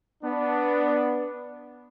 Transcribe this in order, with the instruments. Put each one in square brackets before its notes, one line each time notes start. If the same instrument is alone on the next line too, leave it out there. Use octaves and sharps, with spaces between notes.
[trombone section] B3 D4